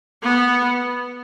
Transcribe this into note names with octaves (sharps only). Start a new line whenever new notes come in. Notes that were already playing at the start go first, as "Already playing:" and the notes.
B3